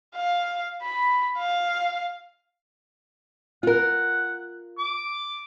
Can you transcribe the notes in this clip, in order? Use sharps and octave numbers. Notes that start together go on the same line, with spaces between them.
F5
B5
F5
F4 A#4 F#5
D6